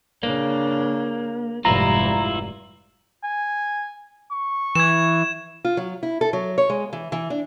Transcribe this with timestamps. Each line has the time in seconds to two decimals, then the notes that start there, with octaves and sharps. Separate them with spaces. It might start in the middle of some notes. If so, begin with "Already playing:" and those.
0.23 C#3 A#3 D4
1.65 F1 G#2 C3 G3 E4 F4 A#5
3.23 G#5
4.31 C#6
4.75 E3 G#6 E7
5.65 F4
5.77 F#3
6.03 E4
6.21 A4
6.33 F#3
6.58 C#5
6.70 G#3
6.93 E3
7.12 E3
7.30 D4